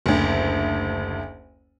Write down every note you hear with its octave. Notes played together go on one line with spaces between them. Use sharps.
F#1 D2